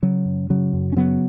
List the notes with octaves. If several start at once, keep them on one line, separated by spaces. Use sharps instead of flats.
C#3 F#3
F#2
C#3 F#3
F#2
C#4
C#3 F#3 B3